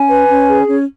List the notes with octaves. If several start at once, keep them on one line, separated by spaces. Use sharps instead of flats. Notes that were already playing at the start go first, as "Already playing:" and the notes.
Already playing: C#4 G#5
B4
C#4
G#4
C#4